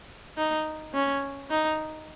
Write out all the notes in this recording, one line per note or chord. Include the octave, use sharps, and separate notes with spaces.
D#4
C#4
D#4